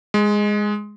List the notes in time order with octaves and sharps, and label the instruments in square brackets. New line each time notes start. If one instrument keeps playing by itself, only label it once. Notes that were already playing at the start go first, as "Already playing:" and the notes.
[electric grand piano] G#3